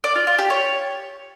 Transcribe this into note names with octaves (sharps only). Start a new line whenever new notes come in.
D5
F4
F4
G4
C#5